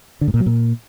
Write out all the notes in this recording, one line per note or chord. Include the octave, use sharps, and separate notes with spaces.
D3
G#2
A#2
F#3
A#2